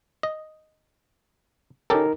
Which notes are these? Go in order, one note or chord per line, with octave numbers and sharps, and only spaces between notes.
D#5
C#4 D#4 G4 A4 A#4